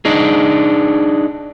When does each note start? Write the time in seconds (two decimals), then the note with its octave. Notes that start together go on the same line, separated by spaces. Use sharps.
0.05 D4 D#4 G#4